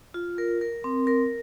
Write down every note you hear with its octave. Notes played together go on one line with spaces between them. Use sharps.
F4
A#4
A#4
C4
A#4